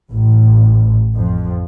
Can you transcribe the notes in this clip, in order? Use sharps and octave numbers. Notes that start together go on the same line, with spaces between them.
A1
F2